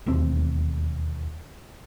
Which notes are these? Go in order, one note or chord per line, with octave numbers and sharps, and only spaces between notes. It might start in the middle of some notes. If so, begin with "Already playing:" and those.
E1 D#2 A3 C4